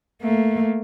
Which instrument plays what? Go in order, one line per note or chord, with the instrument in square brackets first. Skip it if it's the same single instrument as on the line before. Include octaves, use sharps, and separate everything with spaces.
[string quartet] A3 [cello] A#3